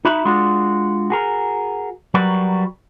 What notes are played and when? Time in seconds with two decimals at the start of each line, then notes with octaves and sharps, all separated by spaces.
0.05 D#4 F#4 E5 B5
0.25 G#3 D4 F4 F#4
1.10 F#4 G#4 A#4
2.14 F#3 G3 F#4 A#4 B4